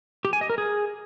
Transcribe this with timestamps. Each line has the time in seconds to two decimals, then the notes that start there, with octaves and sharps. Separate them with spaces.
0.25 G4
0.33 G#5
0.41 D#5
0.50 A#4
0.58 G#4